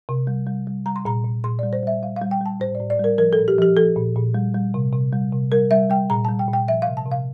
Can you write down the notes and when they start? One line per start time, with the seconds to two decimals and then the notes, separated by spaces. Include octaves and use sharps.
0.09 C3
0.27 G3
0.46 G3
0.67 G3
0.86 G3 A#5
0.96 C6
1.05 A#2 A#5
1.25 A#2
1.44 A#2 C6
1.59 G3 D5
1.73 C5
1.83 G3 E5
2.03 G3 F5
2.16 F5
2.22 G3
2.31 G5
2.41 G3 A5
2.60 A2 C5
2.75 A2 D5
2.90 D5
2.99 G3 A#4
3.18 F3 A#4
3.33 A4
3.38 A#2
3.48 G4
3.58 F3 G4
3.77 F3 A4
3.97 A#2
4.16 A#2
4.34 G3
4.54 G3
4.74 C3
4.93 C3
5.13 G3
5.33 C3
5.52 G3 A#4
5.71 G3 E5
5.90 G3 G5
6.10 A#2 A#5
6.25 G3 A5
6.39 G5
6.48 A#2
6.53 G5
6.68 F3 E5
6.82 C3 F5
6.97 A5
7.06 C3
7.12 F5